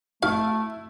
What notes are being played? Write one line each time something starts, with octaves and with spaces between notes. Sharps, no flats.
A3 E4 F#4 F5